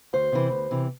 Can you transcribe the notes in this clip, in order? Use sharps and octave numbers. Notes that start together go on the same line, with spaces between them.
D2 C5
C3 E3
D2
C3 E3